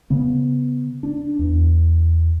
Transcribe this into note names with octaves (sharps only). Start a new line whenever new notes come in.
C#3 B3
D4
E2